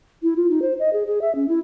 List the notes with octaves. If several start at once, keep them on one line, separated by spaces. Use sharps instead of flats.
E4
F4
D#4
C5
D#5
G#4
G#4
E5
C#4
E4